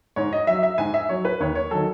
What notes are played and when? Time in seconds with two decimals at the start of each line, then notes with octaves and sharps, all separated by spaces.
0.16 G#2 C#5
0.33 D#5
0.47 F#3 E5
0.63 E5
0.78 G#2 G#5
0.94 E5
1.09 F#3 C#5
1.25 B4
1.40 D#2 C#5
1.55 C#5
1.71 D#3 F#3 A4